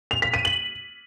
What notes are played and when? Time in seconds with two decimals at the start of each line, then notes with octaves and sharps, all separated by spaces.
0.11 F7
0.22 B6
0.34 D#7
0.45 F#7